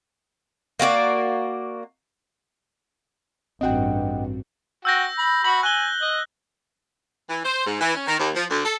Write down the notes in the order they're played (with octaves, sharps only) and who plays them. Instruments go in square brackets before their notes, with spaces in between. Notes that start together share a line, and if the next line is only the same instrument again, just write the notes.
[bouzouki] A#3 F#4 G4 D5
[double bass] A1 G2 [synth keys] C4 D4 F#4 [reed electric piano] D#5 F#5 G5
[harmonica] F#4 G5 [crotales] E6 G6 A#6
[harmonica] B5
[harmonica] F#4 B5 [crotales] F#7
[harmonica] G#5 [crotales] F#6 G7
[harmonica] D#5
[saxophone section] E3
C5
G#2
E3
C#4
D#3
D#2
F3
D2
A4